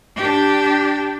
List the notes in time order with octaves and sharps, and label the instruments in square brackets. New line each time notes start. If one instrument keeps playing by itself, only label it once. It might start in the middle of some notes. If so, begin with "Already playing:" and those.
[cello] D4 G4